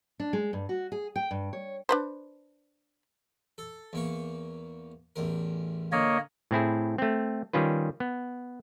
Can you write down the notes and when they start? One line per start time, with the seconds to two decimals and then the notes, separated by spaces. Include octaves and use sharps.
0.20 D4
0.33 G#3
0.53 G2
0.69 F#4
0.92 G#4
1.16 G5
1.31 G2
1.53 C#5
1.89 D4 B4 C5
3.58 A4
3.93 E2 A#3 C#6
5.16 A1 E2 A#4
5.92 D3 A#3 C#5 D#5
6.51 A2 C4 E4 G#4
6.98 A3 C4
7.53 D#3 G3 C#4 F4 B4
8.00 B3